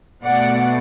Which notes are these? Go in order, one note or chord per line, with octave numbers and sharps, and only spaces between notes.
B2 A3 D5 F#5